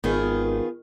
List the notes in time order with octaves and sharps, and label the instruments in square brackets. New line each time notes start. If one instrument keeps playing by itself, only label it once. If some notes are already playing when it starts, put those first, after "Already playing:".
[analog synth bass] G#1 [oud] D#3 [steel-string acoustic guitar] B3 F4 G#4